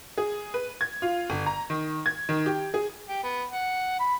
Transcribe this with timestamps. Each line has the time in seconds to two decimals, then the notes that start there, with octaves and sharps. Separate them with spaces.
0.18 G#4
0.54 B4
0.81 G#6
1.02 F4
1.30 G1
1.46 A#5
1.70 D#3
2.06 G#6
2.29 D#3
2.46 G4
2.74 G#4
3.09 G4
3.23 B3
3.51 F#5
3.99 B5